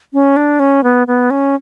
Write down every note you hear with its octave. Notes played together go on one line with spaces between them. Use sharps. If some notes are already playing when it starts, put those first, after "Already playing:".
C#4
D4
C#4
B3
B3
C#4